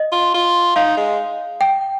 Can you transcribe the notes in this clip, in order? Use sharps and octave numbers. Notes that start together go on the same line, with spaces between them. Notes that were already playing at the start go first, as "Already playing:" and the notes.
Already playing: D#5
F4
F4
D#4 F5
G#3
G5